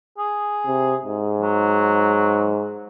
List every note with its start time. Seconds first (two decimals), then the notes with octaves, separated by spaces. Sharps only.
0.18 G#4
0.67 C3
1.05 G#2
1.41 F#3